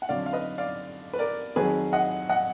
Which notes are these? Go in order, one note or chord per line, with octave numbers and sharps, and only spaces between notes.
F#5
F2 D3 F#3 D5 F5
F5
B4 D#5
D5 F5
B4
A#4 D5
F2 D#3 F#3 G#4 B4
D#5 F#5
D#5 F#5